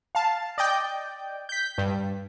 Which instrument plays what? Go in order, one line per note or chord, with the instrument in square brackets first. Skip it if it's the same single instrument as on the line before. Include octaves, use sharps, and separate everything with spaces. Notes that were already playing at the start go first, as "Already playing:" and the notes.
[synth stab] F5 A5
D5 D#5 G5 G6
G6 B6
G2